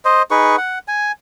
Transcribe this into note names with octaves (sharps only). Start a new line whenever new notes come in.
C5 D#5
D#4 G#4 B4 C#6
F#5
G#5